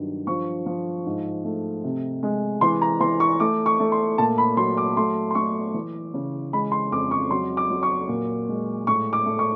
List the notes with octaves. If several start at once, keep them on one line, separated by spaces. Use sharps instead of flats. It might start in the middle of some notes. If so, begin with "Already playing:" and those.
Already playing: G2 D#3 F#3
F3 C#6
F3
G#2
A3
C3
G#3
E3 C6
A#5
E3 C6
C#6
A3 D6
C#6
A3
C6
A#2 A5
B5
F#3 C6
D6
A3 C6
C6
A3 C#6
E3
C#3
G#3 B5
C6
F2 D6
C#6
F#3 C6
D6
F#3
C#6
A#2
G#3
A2 C#6
D6
A3
C#6